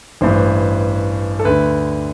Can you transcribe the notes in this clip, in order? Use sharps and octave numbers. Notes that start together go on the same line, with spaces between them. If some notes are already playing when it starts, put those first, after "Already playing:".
A1 G2 E3 C5
A4
D2 D3 B4